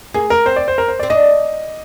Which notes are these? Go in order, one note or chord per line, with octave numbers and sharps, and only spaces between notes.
A#3 G#4
A#4
C4 C5
D5
C5
A#4
C5
C4 D5
D4 D#5